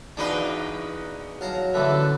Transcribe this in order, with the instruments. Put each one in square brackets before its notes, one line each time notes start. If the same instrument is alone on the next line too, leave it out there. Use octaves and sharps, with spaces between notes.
[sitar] E2 D#4 B4 [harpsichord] D4 F#4 F5
[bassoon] F#3 [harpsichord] F5 A5 A#5
[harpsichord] A1 D3 E5 [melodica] A4 B4